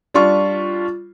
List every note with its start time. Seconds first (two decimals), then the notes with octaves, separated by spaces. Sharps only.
0.14 G3 D4 F4 C#6